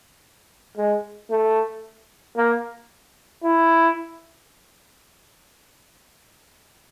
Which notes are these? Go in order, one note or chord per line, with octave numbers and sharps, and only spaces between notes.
G#3
A3
A#3
E4